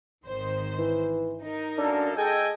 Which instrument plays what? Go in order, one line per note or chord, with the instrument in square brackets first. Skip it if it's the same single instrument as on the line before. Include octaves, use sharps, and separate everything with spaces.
[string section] G#1 D#3 C5
[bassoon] E3
[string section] D#4 A#4
[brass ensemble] F#2 A#3 A4 [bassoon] D4
[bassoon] G#3 [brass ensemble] A4 G5 G#5 [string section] D#5